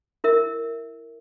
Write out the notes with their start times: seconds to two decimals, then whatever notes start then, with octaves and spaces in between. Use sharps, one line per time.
0.24 E4 A#4 E5